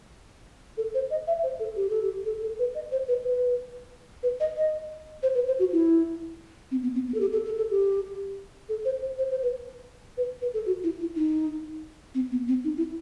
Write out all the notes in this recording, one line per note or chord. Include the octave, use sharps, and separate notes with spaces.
A4
C5
D#5
E5
C5
A4
G4
A4
G4
A4
A4
B4
D#5
C5
B4
B4
B4
D#5
D#5
C5
B4
C5
F#4
E4
C4
B3
C4
B3
A4
G4
A4
A4
A4
G4
A4
C5
C5
C5
C5
B4
B4
B4
A4
F#4
E4
E4
D#4
C4
B3
C4
D#4
E4